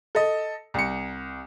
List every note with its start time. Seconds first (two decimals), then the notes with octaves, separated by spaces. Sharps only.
0.15 A4 D#5
0.74 C2 C#7